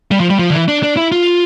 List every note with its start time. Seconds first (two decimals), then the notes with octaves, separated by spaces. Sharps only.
0.11 G3
0.20 F3
0.30 G3
0.39 F3
0.50 D3
0.53 E3
0.68 D4
0.83 D4
0.97 E4
1.12 F4